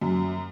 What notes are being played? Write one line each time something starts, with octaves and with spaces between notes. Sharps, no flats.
F#2